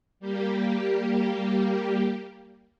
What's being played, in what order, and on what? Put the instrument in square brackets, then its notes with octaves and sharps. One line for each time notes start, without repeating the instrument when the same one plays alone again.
[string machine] G3 A#3 G4